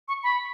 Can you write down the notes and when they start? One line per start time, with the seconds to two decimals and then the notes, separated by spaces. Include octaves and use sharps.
0.08 C#6
0.23 B5